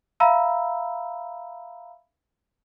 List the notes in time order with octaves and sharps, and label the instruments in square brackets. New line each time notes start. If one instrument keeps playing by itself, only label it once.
[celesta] E5 F5 A#5 B5 E6